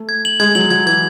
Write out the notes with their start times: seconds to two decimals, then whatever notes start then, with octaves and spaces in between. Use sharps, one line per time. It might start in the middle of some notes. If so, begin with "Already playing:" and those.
Already playing: A3
0.09 G#6
0.25 F#7
0.40 G#3 G#6
0.55 F#3 F#7
0.70 F#3 G#6
0.86 E3 G#6